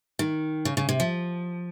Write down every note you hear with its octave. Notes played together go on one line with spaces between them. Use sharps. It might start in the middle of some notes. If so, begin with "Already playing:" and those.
D#3
C#3
C#3
C3
F3